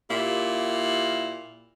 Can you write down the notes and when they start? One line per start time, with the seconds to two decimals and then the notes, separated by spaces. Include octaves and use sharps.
0.11 A#2 E4 G4 F5